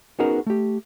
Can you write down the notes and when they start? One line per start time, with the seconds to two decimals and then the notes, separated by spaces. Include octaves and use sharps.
0.19 B3 C#4 D#4 F#4 G#4 A#4
0.46 A3 G4